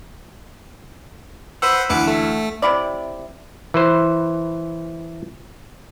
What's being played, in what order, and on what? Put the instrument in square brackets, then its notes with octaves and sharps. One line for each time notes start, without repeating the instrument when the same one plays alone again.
[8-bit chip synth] B4 C5 F#5 [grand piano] E6
[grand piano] D2 E3 [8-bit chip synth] B4 D6 C#7
[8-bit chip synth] A3
[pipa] C3 B3 E4 D5
[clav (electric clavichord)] E3 B4 C5